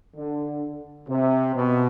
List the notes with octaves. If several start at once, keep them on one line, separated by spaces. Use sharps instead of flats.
D3
C3
B2